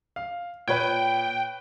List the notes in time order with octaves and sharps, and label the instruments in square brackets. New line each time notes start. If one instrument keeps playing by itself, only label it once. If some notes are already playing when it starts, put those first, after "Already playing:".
[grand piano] F5
[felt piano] A#2 [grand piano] B4 C#5 G#6 [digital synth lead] G5